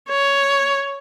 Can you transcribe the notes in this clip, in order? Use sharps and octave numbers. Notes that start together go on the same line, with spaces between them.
C#5